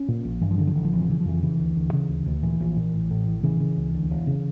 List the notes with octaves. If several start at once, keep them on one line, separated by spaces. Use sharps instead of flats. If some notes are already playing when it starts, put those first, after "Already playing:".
Already playing: C#4
A#2
A#1
G2 E3
F3
D3 E3
F3
A1 E3
F3
F1 E3
F3
C#3 E3
F3
F2 E3
C#3 E3
D2
D2
C#3
D2
D2
A#2 E3
A#1
A#2
A1
A2
A1
C#3 E3
C#3
C#2
D2
E1
C#3